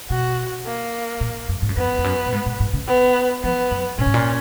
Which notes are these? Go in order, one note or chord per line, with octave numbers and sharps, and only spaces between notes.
B2 F#4
A#3
A#2
F#2
G#2
F#2
F2 B3
F2
F#2
A#2
G#2
A#2
G#2
C#3
B3
F3 B3
F#2
A#2 C#4
G#2
A#2